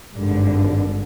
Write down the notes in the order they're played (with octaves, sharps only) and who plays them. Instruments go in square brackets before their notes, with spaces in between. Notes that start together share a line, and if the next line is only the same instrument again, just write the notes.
[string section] G#1 G2 D3